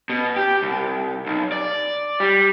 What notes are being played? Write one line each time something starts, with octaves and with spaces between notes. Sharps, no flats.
B2
G4
C2
B1
D5
G3